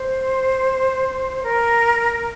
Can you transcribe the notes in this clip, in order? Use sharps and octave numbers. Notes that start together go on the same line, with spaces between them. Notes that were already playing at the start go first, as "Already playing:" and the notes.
Already playing: C5
A#4